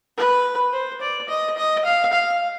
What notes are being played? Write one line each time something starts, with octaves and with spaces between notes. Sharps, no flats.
B4
C5
D5
D#5
D#5
F5
F5